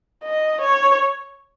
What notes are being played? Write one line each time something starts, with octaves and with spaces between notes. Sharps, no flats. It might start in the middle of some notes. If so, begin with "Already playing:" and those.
D#5
C#5